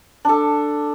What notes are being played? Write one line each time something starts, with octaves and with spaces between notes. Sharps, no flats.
D4 A4